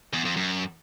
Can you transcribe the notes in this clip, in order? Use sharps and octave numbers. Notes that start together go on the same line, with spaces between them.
E2
F2
F#2